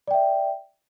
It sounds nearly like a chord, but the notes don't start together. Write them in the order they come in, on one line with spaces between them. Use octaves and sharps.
D5 G5 E5